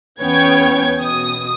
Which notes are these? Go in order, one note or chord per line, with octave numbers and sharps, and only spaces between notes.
E2 B3 C#4 C#5 G5 G#6
B2 D#6